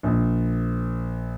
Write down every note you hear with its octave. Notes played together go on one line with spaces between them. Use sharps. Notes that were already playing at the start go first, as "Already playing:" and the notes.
A#1